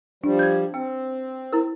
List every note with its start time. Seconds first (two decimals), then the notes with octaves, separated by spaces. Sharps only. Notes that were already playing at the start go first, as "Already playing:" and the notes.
0.24 F3 G3 D4
0.39 G6 G#6
0.74 C4 G5
1.53 E4 A#4